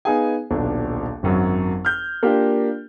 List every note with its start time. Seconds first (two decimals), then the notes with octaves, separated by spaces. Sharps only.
0.05 B3 D#4 G#4 F5 G#5
0.50 D#1 B1 D4 A4
1.23 G#1 F#2 F#3
1.85 F6 G6
2.23 A#3 D4 F4 G4 A#4